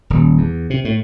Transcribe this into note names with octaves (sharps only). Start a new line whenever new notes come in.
D#1
E2
C3
A2